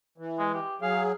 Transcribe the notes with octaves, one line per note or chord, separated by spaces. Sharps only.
E3
G#3
G4
F#3 G#4 F5